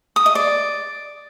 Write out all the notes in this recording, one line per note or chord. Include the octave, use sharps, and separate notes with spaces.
D#6
D#5
D5